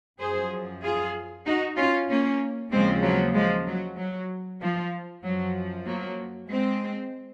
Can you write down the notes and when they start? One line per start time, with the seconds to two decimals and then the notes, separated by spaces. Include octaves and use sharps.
0.19 F#2 F3 G#4 C5
0.82 F4 G#4
1.46 D#4 F#4
1.77 C#4 F4
2.09 A#3 C#4
2.72 D#2 C#3 F3 G#3 C4
3.03 F#3 A#3
3.35 F3 G#3
3.67 F#3
3.98 F#3
4.61 F3
5.24 F#2 F3 F#3
5.87 F#3 A#3
6.50 G#3 C4